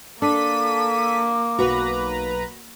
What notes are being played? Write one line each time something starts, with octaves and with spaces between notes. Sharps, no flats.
A#3 D4 A4 D6 B6 D#7
B1 F#4 B4 A#5